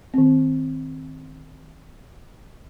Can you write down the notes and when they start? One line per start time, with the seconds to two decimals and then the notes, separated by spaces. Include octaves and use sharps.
0.14 D#3 C4